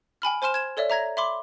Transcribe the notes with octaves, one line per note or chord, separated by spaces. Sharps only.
G5 G#5 B5 F6
C5 G#5 C6 F6 E7
G#6 E7
A4 C#5 D5 E5
E5 A#5 G#6 A#6
E5 B5 C6 D6